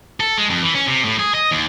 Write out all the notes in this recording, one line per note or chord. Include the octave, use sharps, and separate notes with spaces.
A4
G#3
F2
E3
C#4
C3
A2
G#4
D#5
D#2